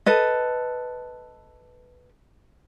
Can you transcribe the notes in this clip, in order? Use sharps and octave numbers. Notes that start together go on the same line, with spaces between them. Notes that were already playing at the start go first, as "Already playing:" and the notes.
A4 B4 D#5